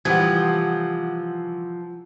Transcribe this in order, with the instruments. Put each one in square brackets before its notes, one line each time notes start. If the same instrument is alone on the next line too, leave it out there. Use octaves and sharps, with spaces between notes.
[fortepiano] C3 E3 G3 [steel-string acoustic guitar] F3 [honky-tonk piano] F#5 D#6 [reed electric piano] G#6